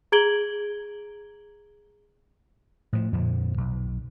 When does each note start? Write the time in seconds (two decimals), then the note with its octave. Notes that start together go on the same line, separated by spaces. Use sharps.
0.12 G#4 A#5 G#6 D7 F#7 G7
2.93 A2 F3
3.13 F2 A#2 D3 F3
3.57 B1